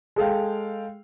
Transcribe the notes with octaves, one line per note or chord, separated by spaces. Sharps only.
G#3 A4 F5 G5